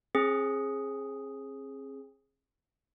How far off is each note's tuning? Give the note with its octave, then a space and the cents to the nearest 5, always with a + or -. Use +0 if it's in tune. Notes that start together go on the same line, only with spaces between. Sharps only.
C4 +45 G#4 +0